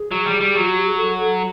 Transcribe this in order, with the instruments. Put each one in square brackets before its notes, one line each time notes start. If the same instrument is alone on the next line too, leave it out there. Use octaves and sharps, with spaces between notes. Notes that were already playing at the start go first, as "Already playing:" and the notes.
Already playing: [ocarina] G#4
[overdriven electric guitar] F#3
G3
G3
[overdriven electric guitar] F#3 [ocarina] F4
[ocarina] F#4
G4
G#4
A4
A4